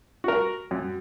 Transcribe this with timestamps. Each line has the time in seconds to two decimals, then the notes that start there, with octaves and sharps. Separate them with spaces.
0.24 F#4 A#4
0.71 F#2